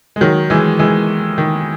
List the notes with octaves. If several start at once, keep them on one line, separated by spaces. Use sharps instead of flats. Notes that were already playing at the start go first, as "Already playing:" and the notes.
G#3
D#3 F#3
E3 G#3
E3 G#3
D#3